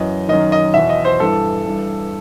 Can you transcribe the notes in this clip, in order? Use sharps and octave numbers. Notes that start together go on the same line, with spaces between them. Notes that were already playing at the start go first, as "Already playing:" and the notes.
Already playing: F#2 E3 D#5
F#2 D#3 D#5
D#5
E2 B2 E5
D#5
C5
G2 E3 A4
G2 E3